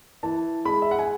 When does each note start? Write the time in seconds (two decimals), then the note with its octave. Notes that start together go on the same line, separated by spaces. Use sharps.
0.23 E3 A5
0.65 G#3 B5
0.82 E5
0.91 F#5
0.99 G#5